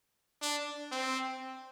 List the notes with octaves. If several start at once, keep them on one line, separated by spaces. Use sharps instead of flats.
D4
C4